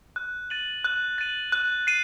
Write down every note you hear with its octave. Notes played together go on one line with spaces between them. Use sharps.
F#6
A6 D#7 F#7
F#6
A6 D#7 F#7
F#6
C7 D#7